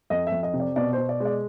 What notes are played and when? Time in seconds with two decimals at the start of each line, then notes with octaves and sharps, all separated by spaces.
0.10 F2 D#5
0.27 E5
0.32 F2
0.43 D#5
0.54 C3
0.60 D5
0.76 B2 D5
0.93 B2 C5
1.09 D5
1.20 G#3
1.25 D5